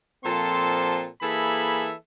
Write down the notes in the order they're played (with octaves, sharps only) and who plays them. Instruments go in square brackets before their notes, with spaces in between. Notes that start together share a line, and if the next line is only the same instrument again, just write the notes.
[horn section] A#2 F3 C4 A4 A5 C6
E3 A#3 G#4 A4 E5 B5